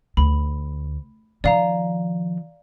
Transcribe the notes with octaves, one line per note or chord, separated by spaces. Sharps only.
D2 B5
D#3 F3 D5 F5 A#5